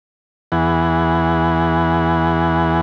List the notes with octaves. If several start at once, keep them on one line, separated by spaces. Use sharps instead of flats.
E2 E3 B3 G#4 F#5